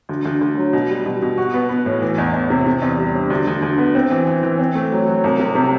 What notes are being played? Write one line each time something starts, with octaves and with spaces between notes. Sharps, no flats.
D2
D2
D2
F#3
B2
G3
B2
B2
F#4
B3
B3
A2
E3
E2
E2
C3
C3
E2
G3
D4
D2
D2
D2
B3
C4
E3
E3
E3
C4
A3
F#3
F#3
C2
C3
C3